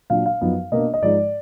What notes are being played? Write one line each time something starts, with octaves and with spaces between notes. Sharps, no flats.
A#2 F#3 D4 F5
F5
F#2 F3 B3 D#4
B2 A#3 D4 D#5
D#5
G#2 F3 G#3 D#4 D5